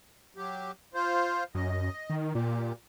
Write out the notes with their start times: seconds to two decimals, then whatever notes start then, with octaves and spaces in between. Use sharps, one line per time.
0.37 F#3 G4
0.94 F4 C5
1.55 F#2 D#5
2.10 D#3
2.35 A#2 G4